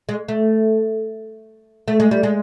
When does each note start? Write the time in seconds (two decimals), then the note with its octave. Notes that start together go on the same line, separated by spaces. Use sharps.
0.09 G#3
0.28 A3
1.88 A3
2.00 G#3
2.11 G3
2.23 G#3